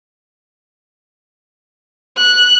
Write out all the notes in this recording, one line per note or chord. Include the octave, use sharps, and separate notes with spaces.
F#6